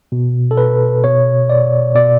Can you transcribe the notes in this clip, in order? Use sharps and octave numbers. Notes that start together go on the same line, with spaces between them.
B2
A4
B4
B2 C#5
D5
B2 D5